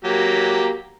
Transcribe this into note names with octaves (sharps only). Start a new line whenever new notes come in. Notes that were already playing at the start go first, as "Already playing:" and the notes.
F#3 A#3 G4